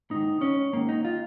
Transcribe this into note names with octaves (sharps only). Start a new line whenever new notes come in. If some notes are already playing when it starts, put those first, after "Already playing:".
G#2 D#3 D#4
C#4
G#2 D#3 A#3
D#4
F4